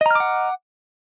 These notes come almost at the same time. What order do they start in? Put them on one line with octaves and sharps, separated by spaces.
D#5 A#5 F6 D6 F#5